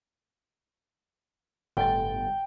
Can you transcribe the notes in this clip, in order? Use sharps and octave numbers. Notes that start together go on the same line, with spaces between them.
G1 A2 A4 G5 A6